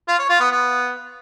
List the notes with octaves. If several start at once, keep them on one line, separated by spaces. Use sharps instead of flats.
F4
C#5
F4
B3
B3